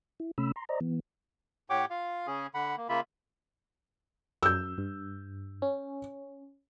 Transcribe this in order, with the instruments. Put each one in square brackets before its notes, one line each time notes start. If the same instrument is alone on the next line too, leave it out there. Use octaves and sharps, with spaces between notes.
[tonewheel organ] E4
C3 A3 C#4 B5 E6
A#5 C6
C5 D5 D#5 A#5
E3 B3
[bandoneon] A2 G4 C#5 F#5 G5 D6
F4 F5
C#3 C#4 G#4
D3 F#5 B5
A#3
C#3 A#3 F4 E5 B5
[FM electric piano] F#2 [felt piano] E6 G6
[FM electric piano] G2
C#4